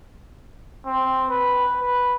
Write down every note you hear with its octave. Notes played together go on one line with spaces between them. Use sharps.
C4
B4
B4